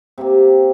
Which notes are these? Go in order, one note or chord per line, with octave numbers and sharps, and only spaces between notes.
C3 A#3 G4